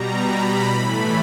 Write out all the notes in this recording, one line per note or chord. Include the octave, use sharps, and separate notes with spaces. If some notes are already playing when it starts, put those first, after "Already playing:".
Already playing: B2 G3 A#5
B5
A2 E3 A3